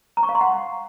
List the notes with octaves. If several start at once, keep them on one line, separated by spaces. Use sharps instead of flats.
A#5
C#6
F5
C6
F#5